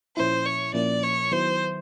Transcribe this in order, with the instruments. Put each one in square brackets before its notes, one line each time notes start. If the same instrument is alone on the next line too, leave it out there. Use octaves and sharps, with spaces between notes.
[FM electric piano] A#2 F3 A#3 C#4 E4 [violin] C5
[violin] C#5
[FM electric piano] A#2 F3 A#3 C#4 E4 [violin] D5
[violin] C#5
[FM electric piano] D#3 F#3 B3 E4 [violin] C5